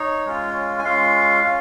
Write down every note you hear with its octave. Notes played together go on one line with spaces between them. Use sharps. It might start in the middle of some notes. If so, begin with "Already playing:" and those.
Already playing: D#4 C#5
G#3 C#4 F4
G#5
G#3 C#4 F4 F5
C#4 F4